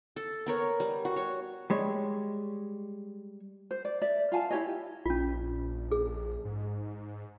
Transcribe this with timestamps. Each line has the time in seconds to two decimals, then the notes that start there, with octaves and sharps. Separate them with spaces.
0.16 A4
0.46 B3 A#4 C#5
0.80 G3
1.05 F#4
1.16 C#5
1.70 G3 G#3 C#5
3.71 C5
3.85 D5
4.02 D5 E5
4.32 F4 F5 G#5 A5
4.51 E4 G4 C#5 D#5
5.06 A#1 C#4 F4
5.92 G#4
6.45 G#2